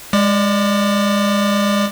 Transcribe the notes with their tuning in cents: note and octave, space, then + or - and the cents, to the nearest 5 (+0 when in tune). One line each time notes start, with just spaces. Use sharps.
G#3 -20 D5 +0 D6 +30